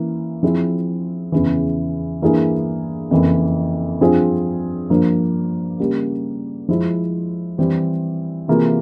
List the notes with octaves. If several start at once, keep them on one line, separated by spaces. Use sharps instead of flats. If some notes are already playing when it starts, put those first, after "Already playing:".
Already playing: E3 A#3 C#4 E4
F3 C4 E4 G#4
E2 C#3 E3
G2 E3 A#3 E4 G#4
F2 C#3 E3 A#3
G2 F3 C4 F4 G#4
G2 F3 A#3
C#3 G3 A#3
F3 G#3 E4
E3 G3 C4 G4
C3 E3 A#3 F4 G#4